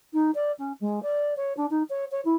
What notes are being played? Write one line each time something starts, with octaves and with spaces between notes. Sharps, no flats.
D#4
D5
C#4
G#3
D5
C#5
D4
D#4
C#5
C#5
E4